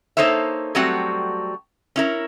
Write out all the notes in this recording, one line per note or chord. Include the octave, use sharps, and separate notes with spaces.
A#3 D#4 A4 C5 C#5 E5
F#3 G3 A3 C4 F#4 F#5
C#4 E4 A#4